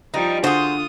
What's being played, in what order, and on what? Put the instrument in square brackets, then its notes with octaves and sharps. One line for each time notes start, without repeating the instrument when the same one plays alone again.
[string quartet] F3 G3 [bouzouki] D#4
[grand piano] D3 [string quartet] F4 D#6 [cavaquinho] F#4 G#4 [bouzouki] C5